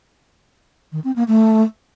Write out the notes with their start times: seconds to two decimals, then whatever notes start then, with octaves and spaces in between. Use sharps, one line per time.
0.92 D#3
1.04 C4
1.16 A#3
1.28 A3